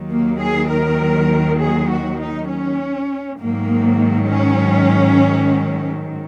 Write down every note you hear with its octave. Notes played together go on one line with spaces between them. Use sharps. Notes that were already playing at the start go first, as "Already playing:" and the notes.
Already playing: D#2 D#3 F#3
A#3
G#4
A#4
G#4
F#4
D#4
C#4
G#2 D#3 F#3 A#3
C#4